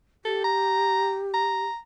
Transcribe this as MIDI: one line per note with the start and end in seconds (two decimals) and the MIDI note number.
0.25 1.64 67
0.25 0.40 69
0.44 1.19 82
1.34 1.77 82